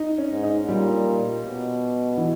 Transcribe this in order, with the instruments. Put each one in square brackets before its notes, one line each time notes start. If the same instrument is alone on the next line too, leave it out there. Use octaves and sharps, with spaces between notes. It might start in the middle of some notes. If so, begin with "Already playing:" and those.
Already playing: [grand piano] D#4
C#4
[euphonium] G#2
[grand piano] D#4
[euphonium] A#2 [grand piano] G3
[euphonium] B2
[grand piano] E3